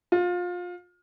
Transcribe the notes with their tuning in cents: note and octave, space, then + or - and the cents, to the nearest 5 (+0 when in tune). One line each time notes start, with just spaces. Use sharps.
F4 +25